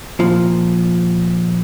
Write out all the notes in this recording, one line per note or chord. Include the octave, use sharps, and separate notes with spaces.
A#2 F3